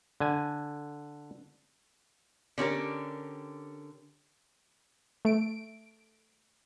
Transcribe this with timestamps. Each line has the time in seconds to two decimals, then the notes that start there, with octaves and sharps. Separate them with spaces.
0.20 D3 G#5
2.58 D3 C#4 G4 A#4
5.25 A3 D7